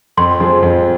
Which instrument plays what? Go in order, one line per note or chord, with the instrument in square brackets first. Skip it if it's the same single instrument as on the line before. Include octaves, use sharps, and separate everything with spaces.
[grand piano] F2 [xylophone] C6
[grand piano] F3 C4 G#4
F2